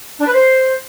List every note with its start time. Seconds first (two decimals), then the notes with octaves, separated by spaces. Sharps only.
0.20 D4
0.27 B4
0.33 C5